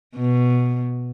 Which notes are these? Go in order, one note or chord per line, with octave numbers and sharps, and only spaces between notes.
B2